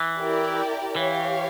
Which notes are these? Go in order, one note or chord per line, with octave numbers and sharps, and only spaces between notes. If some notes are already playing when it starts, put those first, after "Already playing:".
Already playing: E3
E4 G4 A#4 D5
E3 G4 C#5 F5